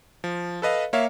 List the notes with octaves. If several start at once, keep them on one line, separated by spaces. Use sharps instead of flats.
F3
A4 B4 D#5 F5
A#3 C#5 E5 F5